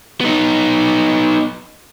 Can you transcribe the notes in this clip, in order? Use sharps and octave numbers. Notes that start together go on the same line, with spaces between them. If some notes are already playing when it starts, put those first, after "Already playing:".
B3 D#4